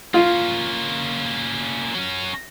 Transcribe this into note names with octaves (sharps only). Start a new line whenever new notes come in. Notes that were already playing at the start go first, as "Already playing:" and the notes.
A#3 C#4 F4
F#3 C#4